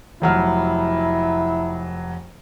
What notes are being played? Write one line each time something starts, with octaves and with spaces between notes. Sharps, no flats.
F1 F#3 E4 F6